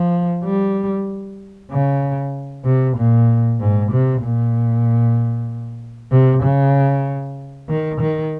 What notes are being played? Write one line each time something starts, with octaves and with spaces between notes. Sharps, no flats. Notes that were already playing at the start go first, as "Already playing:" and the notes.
Already playing: F3
G3
C#3
C3
A#2
G#2
C3
A#2
C3
C#3
D#3
D#3